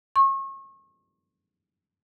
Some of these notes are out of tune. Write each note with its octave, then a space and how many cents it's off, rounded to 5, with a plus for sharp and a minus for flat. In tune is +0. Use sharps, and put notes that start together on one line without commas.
C#6 -35